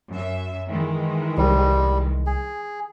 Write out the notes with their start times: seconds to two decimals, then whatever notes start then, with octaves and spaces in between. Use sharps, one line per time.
0.11 F#2 E5
0.70 D#3 E3 G#3
1.38 C2 G3
2.27 G#4